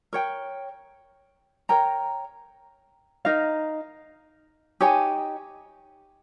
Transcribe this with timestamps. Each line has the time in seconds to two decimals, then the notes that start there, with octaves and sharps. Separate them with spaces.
0.13 A#4 C#5 G5
1.69 A#4 C#5 G5 A#5
3.25 D#4 A#4 F5
4.81 D#4 G4 C#5 G#5